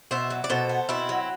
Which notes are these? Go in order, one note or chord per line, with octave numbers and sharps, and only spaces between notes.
B2 C5 E5
F#3
D5
B2 A4 C5
B3
B2 C4 E4
F#3